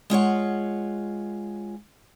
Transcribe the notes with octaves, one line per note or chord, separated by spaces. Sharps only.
G#3 F4 C#5 F#5